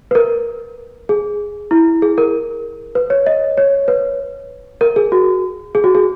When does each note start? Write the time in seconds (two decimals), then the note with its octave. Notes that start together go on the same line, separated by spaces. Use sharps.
0.11 B4
0.15 A#4
1.09 G#4
1.71 E4
2.02 G#4
2.18 A#4
2.95 B4
3.10 C#5
3.26 D#5
3.57 C#5
3.88 B4
4.81 A#4
4.96 G#4
5.12 F#4
5.75 G#4
5.84 F#4
5.95 G#4